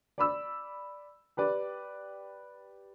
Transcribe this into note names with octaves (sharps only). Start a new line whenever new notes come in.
D5 B5 E6
G4 B4 D5